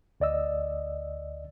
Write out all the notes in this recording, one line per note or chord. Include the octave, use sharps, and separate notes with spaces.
D2 D5 D#5 E6